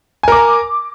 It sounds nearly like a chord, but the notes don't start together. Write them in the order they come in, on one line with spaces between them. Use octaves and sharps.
G#5 A#4 D6 A#5